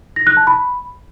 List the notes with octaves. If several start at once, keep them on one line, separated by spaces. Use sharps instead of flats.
A#6
F#6
A5
B5